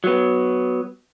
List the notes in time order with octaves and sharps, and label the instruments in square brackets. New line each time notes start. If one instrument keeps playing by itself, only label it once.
[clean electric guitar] F#3 B3